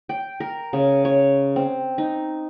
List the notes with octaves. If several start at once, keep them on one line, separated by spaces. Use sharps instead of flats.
G5
A#4
C#3
C#5
C4
D#4